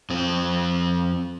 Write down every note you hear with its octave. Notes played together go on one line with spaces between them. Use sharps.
F2 C4